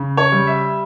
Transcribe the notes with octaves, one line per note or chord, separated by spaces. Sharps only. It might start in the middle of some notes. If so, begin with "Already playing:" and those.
Already playing: C#3
C#5
G3
E5